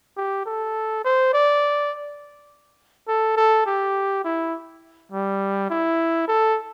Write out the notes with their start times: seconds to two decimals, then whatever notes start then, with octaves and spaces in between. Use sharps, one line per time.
0.17 G4
0.46 A4
1.05 C5
1.33 D5
3.08 A4
3.37 A4
3.66 G4
4.24 E4
5.12 G3
5.70 E4
6.28 A4